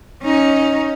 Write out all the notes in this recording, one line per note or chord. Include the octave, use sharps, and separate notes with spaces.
C#4 D#4